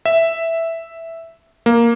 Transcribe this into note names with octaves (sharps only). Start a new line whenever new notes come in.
E5
A#3